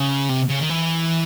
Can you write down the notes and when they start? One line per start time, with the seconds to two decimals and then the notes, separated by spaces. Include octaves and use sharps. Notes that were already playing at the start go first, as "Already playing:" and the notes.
Already playing: C#3
0.29 C3
0.49 C#3
0.60 D#3
0.69 E3